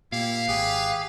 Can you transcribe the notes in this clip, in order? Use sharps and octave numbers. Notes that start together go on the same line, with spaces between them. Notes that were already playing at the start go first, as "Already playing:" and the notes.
A#2 E4 G4 F5
G#1 G4 G#4 B4